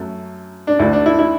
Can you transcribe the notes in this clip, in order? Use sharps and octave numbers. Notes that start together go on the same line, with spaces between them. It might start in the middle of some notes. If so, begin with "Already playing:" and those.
Already playing: F#2 F#3 A3
D4
D2 D3 A3 D4 E4
D4
E4
E4